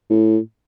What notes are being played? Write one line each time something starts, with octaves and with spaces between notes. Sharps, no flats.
A2